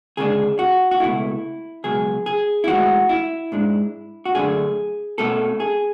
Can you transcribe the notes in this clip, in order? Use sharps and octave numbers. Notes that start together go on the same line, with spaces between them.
D2 C#3 G#3 B3 D4 G#4
F#4
F#4
C#2 B2 A3 E4
C#2 B2 F#3 G#4
G#4
E4
A2 E3 G#3 F#4
E4
G#2 G#3 D4
F#4
F#2 D3 A3 D4 G#4
B2 A3 C#4 A4
G#4